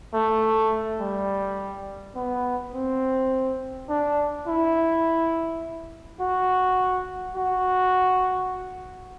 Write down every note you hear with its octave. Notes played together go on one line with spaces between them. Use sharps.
A3
G3
B3
C4
D4
E4
F#4
F#4